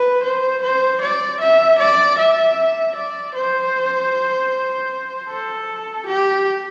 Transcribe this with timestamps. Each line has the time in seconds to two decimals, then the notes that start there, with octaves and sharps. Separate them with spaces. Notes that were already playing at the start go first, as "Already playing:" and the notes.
Already playing: B4
0.23 C5
0.62 C5
1.01 D5
1.40 E5
1.79 D5
2.18 E5
2.95 D5
3.34 C5
5.29 A4
6.07 G4